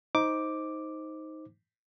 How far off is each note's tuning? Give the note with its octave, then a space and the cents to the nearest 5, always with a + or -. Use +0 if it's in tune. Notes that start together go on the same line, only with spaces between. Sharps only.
D#4 +15 C5 +0 D6 +0